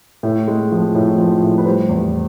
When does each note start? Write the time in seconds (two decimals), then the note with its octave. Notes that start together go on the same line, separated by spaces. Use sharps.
0.23 A2
0.48 G#3
0.72 F3
0.95 A2
1.18 F3
1.43 A2
1.58 B4
1.65 G3 C5
1.89 E2